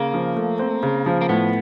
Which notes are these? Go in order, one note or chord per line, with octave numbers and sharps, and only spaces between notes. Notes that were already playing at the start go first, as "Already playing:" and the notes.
Already playing: C#3 A#3
F3
A3
C4
C#3
F3
A#3
A2 B3